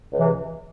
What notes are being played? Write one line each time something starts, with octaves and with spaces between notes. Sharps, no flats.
C#2 C3 E3